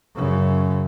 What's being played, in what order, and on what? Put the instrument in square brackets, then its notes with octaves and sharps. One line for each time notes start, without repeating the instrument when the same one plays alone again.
[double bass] F#2 C#3